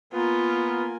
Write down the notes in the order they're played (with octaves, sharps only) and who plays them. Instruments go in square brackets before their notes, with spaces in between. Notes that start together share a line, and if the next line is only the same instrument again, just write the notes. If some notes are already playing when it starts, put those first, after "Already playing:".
[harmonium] A#3 A#4 G#5 [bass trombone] B3 [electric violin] F4